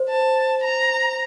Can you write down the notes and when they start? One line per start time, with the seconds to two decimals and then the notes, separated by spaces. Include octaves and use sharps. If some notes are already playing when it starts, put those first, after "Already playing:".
Already playing: C5
0.09 A5
0.64 A#5